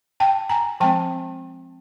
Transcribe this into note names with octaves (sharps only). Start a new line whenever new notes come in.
G5 A5
G#5 A#5
F3 G#3 C4 G5 A5